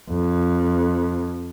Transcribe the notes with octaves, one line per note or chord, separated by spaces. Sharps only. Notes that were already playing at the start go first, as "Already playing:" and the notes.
F2